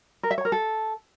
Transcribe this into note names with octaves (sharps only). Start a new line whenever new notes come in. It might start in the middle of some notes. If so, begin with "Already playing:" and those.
A#4
E5
C#5
A#4
A4